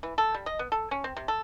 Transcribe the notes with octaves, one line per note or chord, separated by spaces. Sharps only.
E3
A4
G3
D#5
B3
A4
C#4
C4
C3
A4